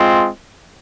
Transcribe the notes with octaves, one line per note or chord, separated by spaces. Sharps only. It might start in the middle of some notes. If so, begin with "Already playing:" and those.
Already playing: G#3 C4 F4